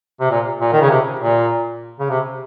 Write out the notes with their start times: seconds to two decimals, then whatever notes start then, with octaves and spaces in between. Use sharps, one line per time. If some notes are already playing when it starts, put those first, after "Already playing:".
0.20 C3
0.30 A#2
0.61 A#2
0.73 D#3
0.81 C#3
0.90 C3
1.20 A#2
1.99 C#3
2.10 C3